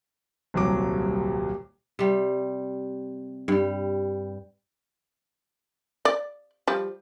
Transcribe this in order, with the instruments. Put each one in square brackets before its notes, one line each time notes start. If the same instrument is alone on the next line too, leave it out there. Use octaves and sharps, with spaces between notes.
[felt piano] D#1 C2 F#3 D6
[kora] C3 G3
G2 G3
[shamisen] D5
F3 G3